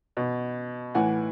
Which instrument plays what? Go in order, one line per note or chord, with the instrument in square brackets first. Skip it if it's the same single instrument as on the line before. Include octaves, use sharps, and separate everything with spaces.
[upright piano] B2
A2 E3 F#5 G#5